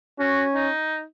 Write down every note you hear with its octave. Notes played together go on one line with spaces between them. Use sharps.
C#4 F#4
D#4